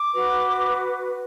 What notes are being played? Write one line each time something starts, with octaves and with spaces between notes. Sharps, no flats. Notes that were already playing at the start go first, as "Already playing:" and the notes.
Already playing: D6
F#4 B4